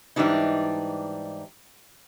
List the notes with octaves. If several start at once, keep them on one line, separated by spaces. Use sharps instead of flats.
G#2 E3 G3 D4 D#4